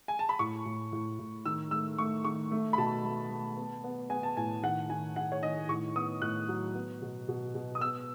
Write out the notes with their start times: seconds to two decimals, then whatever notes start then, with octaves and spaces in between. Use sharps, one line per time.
0.08 G#5
0.19 A5
0.29 B5
0.39 A2 C#6
0.66 A2
0.93 A2
1.19 A2
1.46 D#3 E6
1.71 A3 E6
1.98 A3 C#6
2.25 D#3 C#6
2.51 A3
2.73 B5
2.78 B2 A5
3.05 A3
3.30 A3
3.57 B3
3.84 B3
4.10 B3 G#5
4.23 A5
4.37 A2 G#5
4.63 D#3 F#5
4.90 D#3 G#5
5.16 D#3 F#5
5.32 C#5
5.43 D#3 D#5
5.69 A2 C#6
5.95 B3 D#6
6.22 A2 F#6
6.49 F#3
6.75 B3
7.02 B2
7.28 B2
7.55 B2
7.75 D#6
7.81 B3 E6